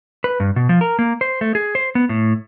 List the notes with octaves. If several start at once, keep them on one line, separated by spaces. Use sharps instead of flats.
B4
G2
B2
F3
A#4
A#3
C5
A3
G#4
C5
B3
A2